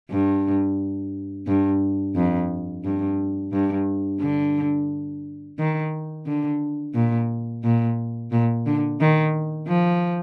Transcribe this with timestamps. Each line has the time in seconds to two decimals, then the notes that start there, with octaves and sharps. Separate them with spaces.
0.10 G2
1.47 G2
2.16 F2
2.84 G2
3.53 G2
4.21 D3
5.58 D#3
6.26 D3
6.95 A#2
7.64 A#2
8.31 A#2
8.66 D3
9.00 D#3
9.68 F3